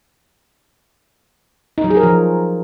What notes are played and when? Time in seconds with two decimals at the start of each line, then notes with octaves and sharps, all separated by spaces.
1.78 D#4
1.84 F#3
1.90 G#4
1.97 A#4
2.03 F3